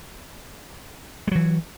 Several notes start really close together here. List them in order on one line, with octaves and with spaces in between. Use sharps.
G#3 F#3 E3